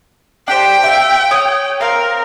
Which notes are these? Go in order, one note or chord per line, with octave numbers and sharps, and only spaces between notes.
D4 G4 C5 G5
E5 F5
C#5 D#6
C4 A#4 F5